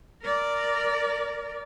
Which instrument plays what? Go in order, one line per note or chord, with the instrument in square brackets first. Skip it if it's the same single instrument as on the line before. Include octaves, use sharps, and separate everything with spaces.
[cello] A#4 D5